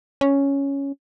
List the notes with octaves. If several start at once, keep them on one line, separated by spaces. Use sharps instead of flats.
C#4